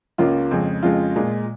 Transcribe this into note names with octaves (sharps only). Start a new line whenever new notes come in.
C#2 C#3 A#3 F4
F2 C#3 G#3
F2 C#3 G#3 F4
A#2 G#3